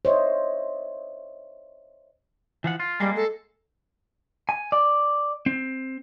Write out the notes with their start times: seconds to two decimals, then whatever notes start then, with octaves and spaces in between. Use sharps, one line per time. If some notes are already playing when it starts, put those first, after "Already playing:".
0.05 C5 C#5 D#5 E5
2.64 E3 F3 F#5
2.80 F4
3.00 G3 G#3 A#3
3.16 A4
4.49 G#5
4.72 D5
5.46 C4